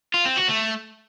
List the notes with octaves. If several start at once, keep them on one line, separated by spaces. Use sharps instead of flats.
F4
C4
F#4
A3